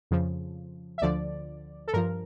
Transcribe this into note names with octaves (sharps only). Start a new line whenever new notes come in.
F2 C#3 F3
E5
D2 D3 F3 D5
A4
G2 F3 A#4